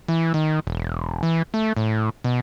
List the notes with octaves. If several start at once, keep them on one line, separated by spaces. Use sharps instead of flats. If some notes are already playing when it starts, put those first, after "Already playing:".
E3
D#3
E1
E3
A3
A2
B2